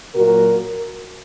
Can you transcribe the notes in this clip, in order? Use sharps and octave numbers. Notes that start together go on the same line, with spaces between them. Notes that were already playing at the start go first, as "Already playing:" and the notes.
A#2 F#3 F#4 A#4